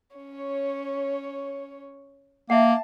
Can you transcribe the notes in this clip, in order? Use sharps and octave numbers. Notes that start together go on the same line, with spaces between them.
C#4 C#5
A#3 E5 F#5 A5